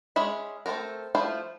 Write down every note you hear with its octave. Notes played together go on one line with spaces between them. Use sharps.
G#3 C#4 G#4 E5 B5
A3 C4 F4 A4 A#4
F3 A3 E4 F4 C5